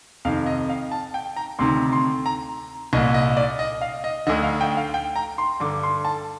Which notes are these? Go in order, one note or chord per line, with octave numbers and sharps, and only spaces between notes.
F2 C3 D#3 F5
D#5
F5
A5
G5
A#5
D2 C3 D#3 C6
C6
A#5
C2 A#2 D#5
D#5
D5
D#5
F5
D#5
D2 D3 D#5
F5
G5
F5
G5
A#5
C6
G2 D3 D6
C6
A5